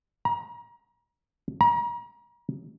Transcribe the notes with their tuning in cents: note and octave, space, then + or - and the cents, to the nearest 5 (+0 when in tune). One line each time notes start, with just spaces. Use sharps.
A#5 +30
A#5 +35